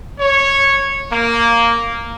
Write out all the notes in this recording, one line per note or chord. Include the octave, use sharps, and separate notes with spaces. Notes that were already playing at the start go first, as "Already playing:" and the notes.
C#5
A#3